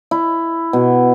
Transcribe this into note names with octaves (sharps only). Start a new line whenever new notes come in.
E4
B2